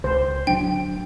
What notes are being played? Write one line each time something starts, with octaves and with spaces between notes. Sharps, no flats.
C#2 C5
D1 F#3 D4 G5